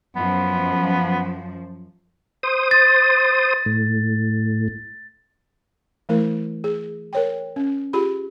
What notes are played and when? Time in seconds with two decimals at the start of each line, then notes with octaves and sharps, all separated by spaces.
0.16 F#2 F3 B3
2.43 C5 D#6
2.71 A6
3.66 A2
6.09 E3 A3 E4 A#4
6.64 G#4
7.13 A#4 C#5 G5
7.56 C#4
7.93 F4 G4 G#4 B5